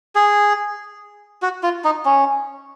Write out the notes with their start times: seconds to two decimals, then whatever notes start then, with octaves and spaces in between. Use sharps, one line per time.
0.15 G#4
1.42 F#4
1.63 F4
1.84 D#4
2.05 C#4